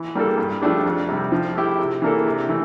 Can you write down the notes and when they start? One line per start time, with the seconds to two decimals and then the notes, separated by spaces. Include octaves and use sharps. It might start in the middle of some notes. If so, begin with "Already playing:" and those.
Already playing: E3
0.15 G3 A#3 D4 A4
0.38 G2
0.62 F3 A3 D4 G4
0.86 F2
1.09 C3 G3
1.32 F3
1.55 A3 E4 G4
1.79 C3
2.02 E3 A#3 D4 A4
2.26 C3
2.49 E3 A3